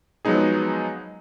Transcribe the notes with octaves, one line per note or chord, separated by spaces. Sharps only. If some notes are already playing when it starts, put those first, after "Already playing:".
F3 F#3 G#3 B3 D#4 G#4